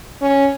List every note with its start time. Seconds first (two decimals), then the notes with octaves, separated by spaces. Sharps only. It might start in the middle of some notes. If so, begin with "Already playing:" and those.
0.21 C#4